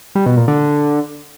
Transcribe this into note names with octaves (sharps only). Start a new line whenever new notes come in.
G3
B2
A#2
D3